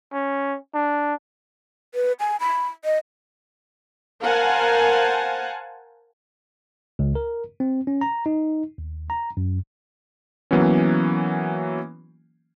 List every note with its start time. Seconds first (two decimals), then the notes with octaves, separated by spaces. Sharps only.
0.13 C#4
0.74 D4
1.95 B4
2.20 G#5
2.40 B5
2.85 D#5
4.22 A#4 C5 F5 F#5 G#5 A5
6.99 C#2
7.15 A#4
7.60 C4
7.87 C#4
8.01 A#5
8.26 D#4
8.78 D#2
9.10 A#5
9.37 F#2
10.51 E3 F#3 A#3 B3 C#4